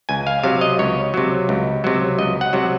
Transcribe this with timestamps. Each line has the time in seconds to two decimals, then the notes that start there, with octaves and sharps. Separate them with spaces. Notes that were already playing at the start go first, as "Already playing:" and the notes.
0.09 C#2 G#5
0.27 F5
0.44 C3 F#3 F5
0.61 D#5
0.79 C#2 C#5
1.14 C3 F#3
1.49 C#2
1.84 C3 F#3
2.19 C#2 D#5
2.41 F#5
2.53 C3 F#3